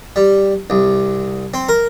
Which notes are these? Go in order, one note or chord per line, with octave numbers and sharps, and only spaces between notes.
G3
C2
C4
A#4